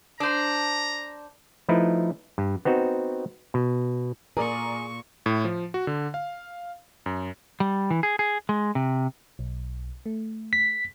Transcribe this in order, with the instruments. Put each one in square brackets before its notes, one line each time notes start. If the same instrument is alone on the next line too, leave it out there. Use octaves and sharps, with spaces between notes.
[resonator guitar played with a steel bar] D4 C5 [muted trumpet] A#5
[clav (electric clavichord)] F3 A3 D#4 E4 B4
G2
B3 C4 D#4 F#4
B2
[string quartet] A#2 C#6 [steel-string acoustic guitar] G#4 [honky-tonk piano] A#4 D5
[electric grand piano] A2
F3
F#4
D3
F5
F#2
[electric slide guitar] G3
E3
G#4
G#4
G#3
C3
[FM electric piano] B1
A3
[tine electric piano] B6